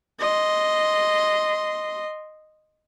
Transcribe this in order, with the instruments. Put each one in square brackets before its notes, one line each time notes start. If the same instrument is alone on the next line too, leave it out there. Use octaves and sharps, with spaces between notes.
[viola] D#5 C6